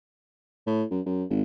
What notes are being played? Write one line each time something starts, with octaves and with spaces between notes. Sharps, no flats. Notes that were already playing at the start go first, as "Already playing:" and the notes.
A2
F#2
F#2
G#1